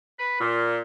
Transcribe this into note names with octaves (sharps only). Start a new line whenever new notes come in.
B4
A#2